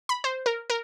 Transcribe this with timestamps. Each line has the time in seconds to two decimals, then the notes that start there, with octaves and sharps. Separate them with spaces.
0.09 B5
0.24 C5
0.46 A#4
0.70 A#4